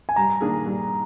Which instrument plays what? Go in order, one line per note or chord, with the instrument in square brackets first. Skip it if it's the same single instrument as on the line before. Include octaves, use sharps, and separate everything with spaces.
[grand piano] G#5
[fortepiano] G2 [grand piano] A#5
[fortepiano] D#3 A#3 D4 G#4
G2